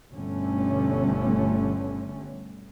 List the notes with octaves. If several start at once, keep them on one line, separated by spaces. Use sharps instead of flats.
G1 B2 D3 G3 A3 C#4